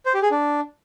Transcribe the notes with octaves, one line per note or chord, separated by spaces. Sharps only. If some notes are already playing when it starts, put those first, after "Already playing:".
C5
G4
G#4
D4